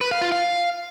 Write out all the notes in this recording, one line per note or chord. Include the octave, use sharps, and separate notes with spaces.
B4
F5
F4
F5